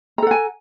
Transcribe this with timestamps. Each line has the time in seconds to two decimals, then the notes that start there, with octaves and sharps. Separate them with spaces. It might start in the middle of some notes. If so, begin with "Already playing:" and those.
0.18 A#5
0.22 A4
0.27 F#5
0.31 G#5